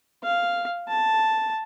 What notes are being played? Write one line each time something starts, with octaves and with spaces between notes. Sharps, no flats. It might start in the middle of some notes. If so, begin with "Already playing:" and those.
F5
A5